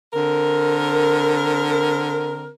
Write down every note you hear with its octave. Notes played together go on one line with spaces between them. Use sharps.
D3 C4 A#4